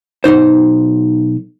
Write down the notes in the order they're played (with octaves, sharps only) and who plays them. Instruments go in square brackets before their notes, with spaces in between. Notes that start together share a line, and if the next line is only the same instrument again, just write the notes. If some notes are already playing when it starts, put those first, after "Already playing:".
[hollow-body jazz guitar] B1 A#2 D#4 C5